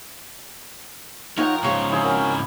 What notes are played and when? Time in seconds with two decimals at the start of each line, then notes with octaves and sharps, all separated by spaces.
1.37 F3 D#4 A#4 C#5 F#5 G5 A#5
1.63 G#2 C#3 C5 C#5 F5
1.90 C4 E4 G#4 A#5
2.03 C#4 F#4 A#4